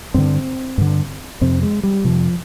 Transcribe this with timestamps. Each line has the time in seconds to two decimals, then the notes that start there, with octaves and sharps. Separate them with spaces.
0.14 G2 D3 C4
0.78 G2 D3
1.41 F2 C3 C4
1.63 G#3
1.83 G3
2.05 F2 C3 F3